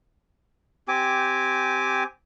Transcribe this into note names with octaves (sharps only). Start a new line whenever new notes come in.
C4 G4 G#5 D6